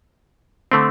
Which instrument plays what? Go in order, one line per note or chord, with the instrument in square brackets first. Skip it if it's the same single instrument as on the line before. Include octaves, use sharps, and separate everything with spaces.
[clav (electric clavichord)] D3 A3 C4